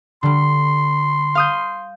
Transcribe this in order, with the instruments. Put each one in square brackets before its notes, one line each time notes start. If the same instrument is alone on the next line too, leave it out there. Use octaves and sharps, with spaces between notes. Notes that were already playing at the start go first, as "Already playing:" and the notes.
[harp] D3 G3 [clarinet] C6
[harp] F5 D#6 G6